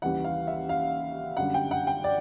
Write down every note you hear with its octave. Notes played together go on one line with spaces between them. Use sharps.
D#2 C#3 E3 G3 F#5
F5
E5
F5
F#2 D3 G3 F#5
G5
F#5
G5
D5